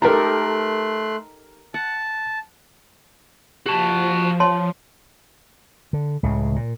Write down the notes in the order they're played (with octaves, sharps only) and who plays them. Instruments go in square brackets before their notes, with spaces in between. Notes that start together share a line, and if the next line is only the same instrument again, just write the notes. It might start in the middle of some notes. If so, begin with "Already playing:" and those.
[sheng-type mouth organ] A3 C6 F#6 [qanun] D#4 G4 A4 [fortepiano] A#4 A#5
[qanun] F#5 [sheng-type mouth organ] A5
[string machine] F3 [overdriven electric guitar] F#4 A5 [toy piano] G4
[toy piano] C#5 A5 C6
[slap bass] D3
C#2 A2 C#3
A#2